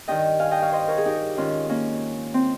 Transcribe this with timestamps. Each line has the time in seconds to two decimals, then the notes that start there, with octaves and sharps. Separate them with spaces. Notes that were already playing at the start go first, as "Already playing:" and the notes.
0.08 G2 D#3 D#5 G5
0.40 F5 G#5
0.51 D#5 G5
0.62 C#5 F5
0.72 C5 D#5
0.88 A#4 C#5
0.98 G#4
1.05 D#4 G4
1.37 G#2 D#3 C#4 F4
1.69 A#3 C#4
2.34 C4